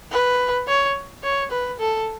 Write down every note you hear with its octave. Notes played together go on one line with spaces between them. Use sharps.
B4
C#5
C#5
B4
A4